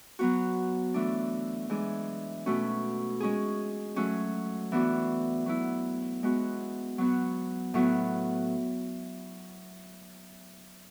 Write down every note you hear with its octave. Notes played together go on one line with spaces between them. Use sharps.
F#3 B3 F#4
E3 A3 D4
E3 G#3 D4 G#4
B2 A3 C#4 F#4
G#3 C#4 G#4
F#3 A3 C#4 F#4
E3 B3 D4 F#4
F#3 B3 E4
G#3 B3 F#4
F#3 B3 F#4
A2 F#3 B3